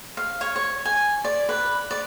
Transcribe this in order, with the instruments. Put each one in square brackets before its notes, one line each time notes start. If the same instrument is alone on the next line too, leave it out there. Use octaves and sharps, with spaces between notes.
[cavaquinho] F5
C#5
C#5
G#5
D5
B4
D5